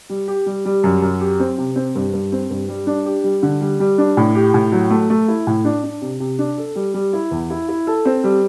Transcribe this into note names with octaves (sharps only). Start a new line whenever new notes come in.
G3
G4
G3
G3
F#2
F#2
G4
C4
C3
C4
G2
G2
C4
G2
G3
D4
G4
G3
D3
G3
G3
D4
A2
G4
A2
F#3
A3
A3
E4
A2
D4
D4
C3
C3
D4
A4
G3
G3
E4
E2
E4
E4
A4
C4
G3